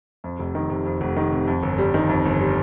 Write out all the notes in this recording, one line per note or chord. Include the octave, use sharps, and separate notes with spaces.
F2
F1
D#3
C3
F2
F1
D#3
C3
F2
G1
G3
D#3
F2
G1
G3